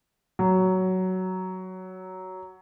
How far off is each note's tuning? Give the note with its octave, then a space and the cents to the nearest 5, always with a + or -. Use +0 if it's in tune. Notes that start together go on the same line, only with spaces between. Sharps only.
F#3 +10